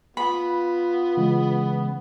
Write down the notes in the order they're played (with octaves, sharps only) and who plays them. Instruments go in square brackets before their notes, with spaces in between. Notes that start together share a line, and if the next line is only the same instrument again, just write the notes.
[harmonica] B3 [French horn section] F4 [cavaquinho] B5
[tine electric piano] C#3 E3 G#3